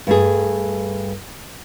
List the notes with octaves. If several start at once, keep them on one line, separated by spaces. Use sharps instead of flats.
G2 A3 G#4